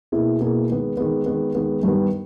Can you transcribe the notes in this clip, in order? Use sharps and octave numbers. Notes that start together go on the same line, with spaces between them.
B2 A#3 E4 G#4
B2 A#3 E4 G#4
D#3 G#3 B3
D#3 G#3 B3
D#3 G#3 B3
D#3 G#3 B3
G2 D#3 G3 B3